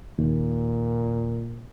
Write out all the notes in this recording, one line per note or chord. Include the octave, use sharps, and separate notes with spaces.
D#2 A#2